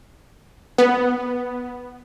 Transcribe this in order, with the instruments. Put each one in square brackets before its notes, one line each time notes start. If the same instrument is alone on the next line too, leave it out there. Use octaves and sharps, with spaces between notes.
[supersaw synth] B3